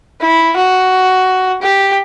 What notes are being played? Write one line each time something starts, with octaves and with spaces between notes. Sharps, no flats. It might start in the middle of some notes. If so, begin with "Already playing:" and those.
E4
F#4
G4